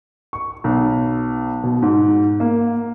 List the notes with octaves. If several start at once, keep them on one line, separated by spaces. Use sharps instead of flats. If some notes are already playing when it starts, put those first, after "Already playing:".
C#6
B1
B2
G#2
A#3